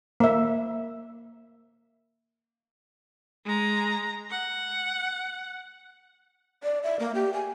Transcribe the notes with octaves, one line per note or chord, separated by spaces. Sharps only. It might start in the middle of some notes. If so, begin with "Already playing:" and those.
A#3 E5
G#3 A#5
F#5
D5
E5
A#3
G4
G#5